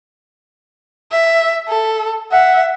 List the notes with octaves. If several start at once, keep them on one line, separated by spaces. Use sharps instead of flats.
E5
A4
E5 F#5